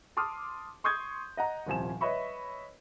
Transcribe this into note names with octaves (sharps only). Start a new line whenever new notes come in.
A5 C6 D6 D#6 F6
C6 C#6 D#6 G6 G#6
D#5 F#5 A#5
D#1 C2 F3 G#5 E7
B4 C#5 D#5 E5 B5 C#6